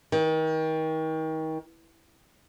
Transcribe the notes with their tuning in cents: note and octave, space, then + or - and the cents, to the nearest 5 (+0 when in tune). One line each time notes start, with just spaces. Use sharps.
D#3 +35